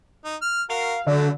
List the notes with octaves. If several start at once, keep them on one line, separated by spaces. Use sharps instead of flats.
D#4
F6
F#4 A#4 F5
D3 F#3 A3